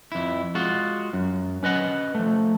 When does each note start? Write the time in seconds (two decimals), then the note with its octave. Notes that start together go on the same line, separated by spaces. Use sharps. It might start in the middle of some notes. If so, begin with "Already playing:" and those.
0.12 F2 E4
0.55 G#3 F4 F#4
1.13 F#2
1.63 C#4 B4 D#5 F#5
2.15 F3 A3